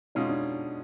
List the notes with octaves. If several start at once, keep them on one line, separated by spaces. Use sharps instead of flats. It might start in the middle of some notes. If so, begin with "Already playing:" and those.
B2 G#3 C#4 D#4 F4
D4